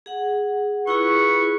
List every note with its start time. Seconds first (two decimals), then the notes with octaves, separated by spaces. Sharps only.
0.06 G#4 F#5
0.87 E4 F4 G#4 B4 C#6